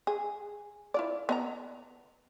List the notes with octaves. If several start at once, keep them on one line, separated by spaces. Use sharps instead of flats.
G#4
E4 F4 D5
B3 D#5 A#5